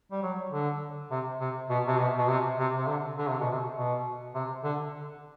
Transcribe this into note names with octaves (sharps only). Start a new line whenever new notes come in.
G3
F#3
D3
C3
C3
B2
C3
B2
B2
C3
C3
C3
D3
D3
C3
B2
C3
B2
C3
D3